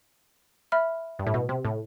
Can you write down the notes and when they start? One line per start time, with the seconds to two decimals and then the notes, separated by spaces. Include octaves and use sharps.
0.72 E5 B5 F6
1.19 G2
1.27 A2
1.34 B2
1.49 C3
1.65 A2